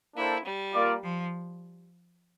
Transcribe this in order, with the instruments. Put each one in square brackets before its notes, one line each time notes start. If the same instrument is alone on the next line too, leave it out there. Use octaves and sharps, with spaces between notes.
[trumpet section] A#3 D4 A4 C5 G5 [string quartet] E4
[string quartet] G3
[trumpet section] A#3 F4 A#4 D5
[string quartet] F3